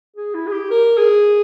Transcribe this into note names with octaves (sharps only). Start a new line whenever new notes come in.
G#4
E4
G#4
G4
A#4
G#4